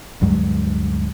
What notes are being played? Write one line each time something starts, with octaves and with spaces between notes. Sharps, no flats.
D2 G2 F#3 G#3